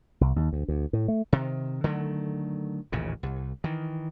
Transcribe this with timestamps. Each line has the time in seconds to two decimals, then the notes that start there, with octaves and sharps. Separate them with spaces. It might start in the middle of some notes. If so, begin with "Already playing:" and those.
0.21 C2
0.36 D#2
0.53 D2
0.68 D2
0.93 A2
1.08 A3
1.33 C3 D#3
1.84 D3 D#3 F#3 A3
2.92 A1 D#2 A#2 C#3
3.23 C2
3.64 D#3 E3